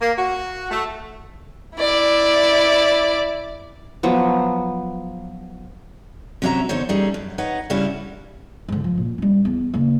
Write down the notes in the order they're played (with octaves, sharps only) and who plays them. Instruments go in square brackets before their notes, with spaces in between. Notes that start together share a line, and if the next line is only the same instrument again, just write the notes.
[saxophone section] A#3
F#4
A3
[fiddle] E4 D5
[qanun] F3 F#3 B3
[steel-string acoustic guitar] C3 F#3 C#4 D5 E5 A#5
E2 D3 D#4 C5 C#5
G3 A3 C#4 D#4 G#4
F#2
D#4 B4 C#5 F#5
C#3 G3 C#4 D4 E4 F#4
[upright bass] G#2 D3
F3
A#2
G3 C#4
E2
C#3 A#3